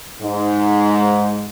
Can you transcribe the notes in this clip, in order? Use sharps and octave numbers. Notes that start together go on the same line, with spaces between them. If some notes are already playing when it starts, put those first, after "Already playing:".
G#2